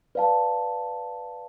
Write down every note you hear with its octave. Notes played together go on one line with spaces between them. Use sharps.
B4 D5 F5 A5